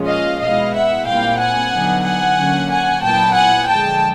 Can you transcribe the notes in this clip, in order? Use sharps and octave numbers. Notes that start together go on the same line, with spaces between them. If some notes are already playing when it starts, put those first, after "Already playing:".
Already playing: A#2 F3 G#3 C#4 F4
D#5 F5
B2 G#3 B3 E4 D#5 F5
E5 F#5
A#2 G3 C4 E4 F5 G5
F#5 G#5
D3 F#3 B3 D#4
F#5 G#5
D3 F#3 A#3 C#4
F#5 G#5
A#2 F#3 B3 E4 G5 A5
F#5 G#5
D3 F3 G#3 G5 A5